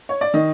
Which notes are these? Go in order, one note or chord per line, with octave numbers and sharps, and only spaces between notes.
C#5
D5
D#3 D#5